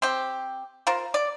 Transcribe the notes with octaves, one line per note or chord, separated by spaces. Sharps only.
C4 G4
F4 A#4 C5
D5